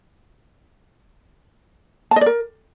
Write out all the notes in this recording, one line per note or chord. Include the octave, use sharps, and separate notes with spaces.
A5
D#5
D5
A#4